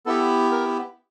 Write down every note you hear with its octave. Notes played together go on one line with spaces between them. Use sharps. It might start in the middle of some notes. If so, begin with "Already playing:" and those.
B3 E4 G4 A4
A#4